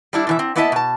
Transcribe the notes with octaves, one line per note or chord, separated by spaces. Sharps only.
G3 D4 E4
B2 E3 E5
C4
A#3 B3 E4 D#5 E5 A5
B2 A5